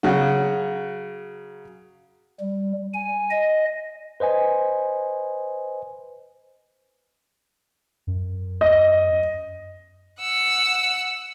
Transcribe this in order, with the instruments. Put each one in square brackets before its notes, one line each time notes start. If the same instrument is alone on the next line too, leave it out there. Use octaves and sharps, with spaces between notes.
[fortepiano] C#3 F#3 F#4
[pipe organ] G3
G#5
D#5
[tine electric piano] B4 C5 D#5 G#5
[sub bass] F#2
[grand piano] D#5
[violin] F#5 E6